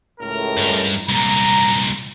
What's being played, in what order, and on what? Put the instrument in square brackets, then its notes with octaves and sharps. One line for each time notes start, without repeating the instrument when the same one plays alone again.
[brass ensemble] C#2 A2 A#4
[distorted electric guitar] G2
[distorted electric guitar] C2 A#2 [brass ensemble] A#5